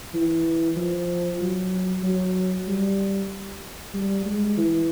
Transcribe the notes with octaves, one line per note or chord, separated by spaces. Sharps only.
E3
F3
F#3
F#3
G3
G3
G#3
E3